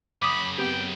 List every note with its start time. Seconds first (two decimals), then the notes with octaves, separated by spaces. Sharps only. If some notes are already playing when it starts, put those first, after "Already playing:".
0.22 F#2 C#3 B5 D6 D#6
0.58 B3 C4 G4 G5